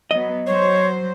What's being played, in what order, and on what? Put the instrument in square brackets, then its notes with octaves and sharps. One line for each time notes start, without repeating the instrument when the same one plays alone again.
[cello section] F#3 B3 [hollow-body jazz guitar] D#5
[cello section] F#3 C5 [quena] C#5